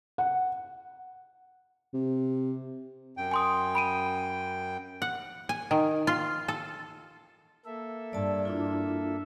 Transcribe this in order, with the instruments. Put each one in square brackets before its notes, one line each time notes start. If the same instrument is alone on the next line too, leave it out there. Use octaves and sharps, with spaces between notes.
[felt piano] F#5
[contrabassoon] C3
[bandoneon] F#2 G5
[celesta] G#5 C6 D#6
B5 D7 D#7
[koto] F#5
G#5
D#3
F4
A4
[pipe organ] A#3 A4 E5
[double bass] G2 [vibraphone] D5 A5
[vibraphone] D4 E4 F4